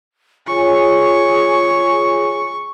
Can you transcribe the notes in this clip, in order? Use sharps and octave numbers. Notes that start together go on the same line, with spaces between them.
F4 G#4 C#5 G#5 C#6